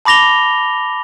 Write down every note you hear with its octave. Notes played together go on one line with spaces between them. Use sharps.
A5 B5 D6 A#6 F7 G7